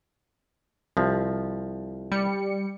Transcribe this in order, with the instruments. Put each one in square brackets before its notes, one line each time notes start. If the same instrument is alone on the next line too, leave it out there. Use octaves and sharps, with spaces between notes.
[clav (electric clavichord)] C2 F3
[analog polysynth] G3 C#7